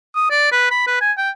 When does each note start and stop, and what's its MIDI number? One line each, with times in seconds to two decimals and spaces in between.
0.15 0.29 87
0.30 0.49 74
0.52 0.70 71
0.71 0.87 83
0.87 0.97 71
1.01 1.12 80
1.18 1.30 79